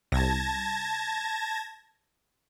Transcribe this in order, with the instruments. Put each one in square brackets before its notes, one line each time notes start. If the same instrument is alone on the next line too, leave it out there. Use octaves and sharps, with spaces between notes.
[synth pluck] C2 [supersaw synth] A5 G#6 A#6